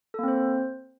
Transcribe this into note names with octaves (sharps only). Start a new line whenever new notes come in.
A#3 C4 A4 C5